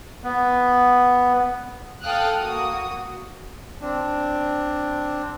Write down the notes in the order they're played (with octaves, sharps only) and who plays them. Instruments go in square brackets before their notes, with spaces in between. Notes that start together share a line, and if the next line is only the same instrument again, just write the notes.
[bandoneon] B3
[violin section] A4 F5 G5 D#6 F6 F#6
A#3 F#4 D#6
[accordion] C4 D4